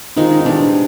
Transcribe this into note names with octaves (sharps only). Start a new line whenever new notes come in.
D#3 G#3 C4 D#4 F4
D#4
C3 E3 G#3 D4